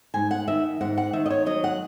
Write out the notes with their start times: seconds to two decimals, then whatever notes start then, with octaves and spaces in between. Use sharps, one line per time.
0.14 G#2 G#5
0.31 F#5
0.48 D#3 E5
0.81 G#2 F#5
0.98 F#5
1.13 D#3 E5
1.26 D#5
1.30 C#5
1.46 F#3 D#5
1.64 F#5